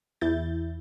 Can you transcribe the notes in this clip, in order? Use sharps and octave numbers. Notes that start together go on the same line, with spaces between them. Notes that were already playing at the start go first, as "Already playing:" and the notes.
E2 E4 G6 A6